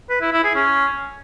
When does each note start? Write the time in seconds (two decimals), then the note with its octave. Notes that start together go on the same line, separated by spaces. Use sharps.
0.10 B4
0.21 E4
0.33 E4
0.44 G#4
0.55 C#4